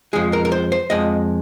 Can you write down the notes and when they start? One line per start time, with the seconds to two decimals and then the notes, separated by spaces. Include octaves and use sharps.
0.13 F2 F3 G#3 G#4
0.33 A#4
0.45 A#4
0.52 C5
0.72 C5
0.90 F2 F3 G#3 D#5